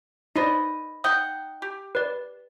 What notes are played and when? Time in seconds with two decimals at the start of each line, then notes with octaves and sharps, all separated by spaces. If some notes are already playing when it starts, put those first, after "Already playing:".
0.36 D#4 B4 C5 D5 D#5
1.04 D#4 F#5 G5 D#6
1.62 G4
1.95 B4 D5